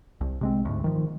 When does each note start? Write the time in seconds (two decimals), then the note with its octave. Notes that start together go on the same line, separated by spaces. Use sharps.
0.21 C2
0.41 C3 G#3 C4
0.65 D2 G#2
0.84 D#3 F3